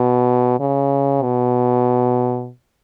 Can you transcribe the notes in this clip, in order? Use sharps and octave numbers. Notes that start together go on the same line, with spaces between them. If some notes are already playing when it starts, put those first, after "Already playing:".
Already playing: B2
C#3
B2